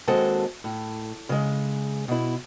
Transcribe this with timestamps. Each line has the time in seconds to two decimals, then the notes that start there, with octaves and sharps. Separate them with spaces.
0.08 D#2 G#3 C4 F#4 A4 A5
0.64 A2
1.29 C#3 G#3
2.08 B2 E4